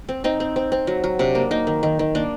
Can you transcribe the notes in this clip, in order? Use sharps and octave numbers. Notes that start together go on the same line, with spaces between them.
C4
C4 D#4
C4
C4
C4
F#3
F#3
C3 D4
A#3
A#3 D#4
D#3
D#3
D#3
A#3 D4